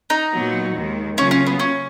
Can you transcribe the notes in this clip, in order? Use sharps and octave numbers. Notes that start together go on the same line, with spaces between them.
D#4
A#2 F#3 B3 F#4
D#2 D#3 G#3
C#3 F#3 A#3 C#4 F4
C#4
B3
C#4